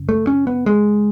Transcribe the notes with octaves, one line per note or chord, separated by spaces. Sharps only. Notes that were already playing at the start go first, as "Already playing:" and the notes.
Already playing: F#2 C#3
A3
C#4
B3
G#3